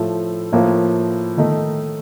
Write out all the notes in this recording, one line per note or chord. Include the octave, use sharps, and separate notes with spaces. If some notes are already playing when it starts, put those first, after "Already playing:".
Already playing: A2 F3 A3
A2 F3 A#3
D#3 A3 D#4